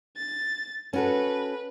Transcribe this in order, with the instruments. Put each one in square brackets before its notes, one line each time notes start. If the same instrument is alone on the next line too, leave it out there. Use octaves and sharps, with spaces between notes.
[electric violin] A6
[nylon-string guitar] C#4 F#4 A4 [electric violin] B4